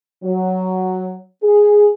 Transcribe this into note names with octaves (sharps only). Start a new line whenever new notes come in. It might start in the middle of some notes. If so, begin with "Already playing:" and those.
F#3
G#4